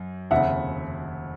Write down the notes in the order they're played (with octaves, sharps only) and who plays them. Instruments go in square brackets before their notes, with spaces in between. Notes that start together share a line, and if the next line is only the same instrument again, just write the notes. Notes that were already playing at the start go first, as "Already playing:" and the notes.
Already playing: [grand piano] F#2
[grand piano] F1 D#2 C#3 [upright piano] E5 F#5